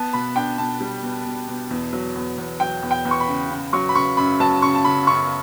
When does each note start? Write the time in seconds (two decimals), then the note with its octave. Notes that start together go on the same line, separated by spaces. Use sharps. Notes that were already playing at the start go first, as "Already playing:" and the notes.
Already playing: B3 A5
0.13 B2 B5
0.36 D4 G5
0.58 B2 A5
0.80 G3
1.03 B2
1.26 B2
1.48 B2
1.71 E2
1.93 F#3
2.15 E2
2.38 E2
2.60 F#3 G5
2.83 E2
2.91 G5
3.05 E2
3.11 C#6
3.20 B5
3.28 C#3
3.50 C#3
3.73 F#3 C#6
3.89 B5
3.95 C#3 C#6
4.17 F#2 B5
4.40 F#3 A5
4.62 C#3 C#6
4.75 A5
4.84 C#3 B5
5.07 F#2 C#6